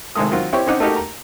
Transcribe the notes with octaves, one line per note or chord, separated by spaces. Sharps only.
G#1 C3 D#3 G#3 A3 D#6
D#3 F#3 C4 F4
C4 E4 G4 C#5 G5 C#6
C4 C#4 D#4 F#5 G5 D6
A3 A#3 D#4 F#4 G4 A#4
A#5